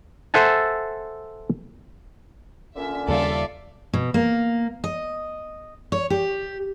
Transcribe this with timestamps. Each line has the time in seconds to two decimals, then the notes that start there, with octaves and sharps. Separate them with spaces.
0.34 A4 C5 E5 F#5 G#5 A5
2.76 A#2 D3 C#4 E5
3.08 D#2 C#3 G3 F4 A4 D5 E5
3.93 B2
4.14 A#3
4.84 D#5
5.92 C#5
6.10 G4